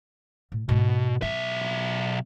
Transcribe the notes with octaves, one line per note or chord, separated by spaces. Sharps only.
A2
G#2 B2 B3
B1 B3 E5